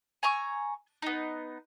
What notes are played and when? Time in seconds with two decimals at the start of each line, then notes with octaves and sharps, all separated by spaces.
0.23 G#5 A#5 C#6 E6
1.02 B3 D#4